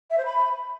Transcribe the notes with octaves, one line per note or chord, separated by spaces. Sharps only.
E5
C5
B5